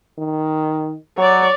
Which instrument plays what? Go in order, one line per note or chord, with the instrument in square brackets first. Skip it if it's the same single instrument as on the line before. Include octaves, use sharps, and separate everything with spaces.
[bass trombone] D#3
[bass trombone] F#3 [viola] C#5 D5